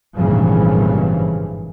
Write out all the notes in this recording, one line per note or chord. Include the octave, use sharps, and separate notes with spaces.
G#1 G2 A#2 C#3 E3 F3